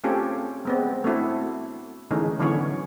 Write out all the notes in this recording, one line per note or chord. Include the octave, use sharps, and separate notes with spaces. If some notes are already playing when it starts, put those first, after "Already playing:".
A3 C4 C#4 F4 G4 A4
G#3 B3 C4
A3 C4 D4 E4 F#4
D3 E3 G#3 A3 C#4 D#4
D3 E3 F#3 B3 C#4 C#5